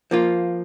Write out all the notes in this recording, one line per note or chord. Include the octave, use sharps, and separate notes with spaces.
F3 A#3 F4